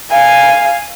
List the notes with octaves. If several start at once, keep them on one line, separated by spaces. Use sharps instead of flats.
F5 G#5